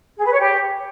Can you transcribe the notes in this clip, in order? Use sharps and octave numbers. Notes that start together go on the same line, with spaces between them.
G#4
B4
C#5
G4